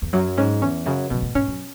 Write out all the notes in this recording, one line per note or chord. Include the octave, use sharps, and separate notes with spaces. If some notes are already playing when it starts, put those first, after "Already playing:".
E2
F#2 F#3
G#2 C#4
E2 C#4
F#2 C#3
F#2 B2
A2
G#2 C#4
F#2